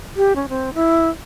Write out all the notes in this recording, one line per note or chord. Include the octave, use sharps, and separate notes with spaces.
G4
C#4
C4
E4